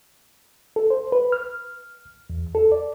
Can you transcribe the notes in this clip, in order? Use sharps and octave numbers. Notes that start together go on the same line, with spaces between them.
A4
C5
B4
F6
E2
A4
D5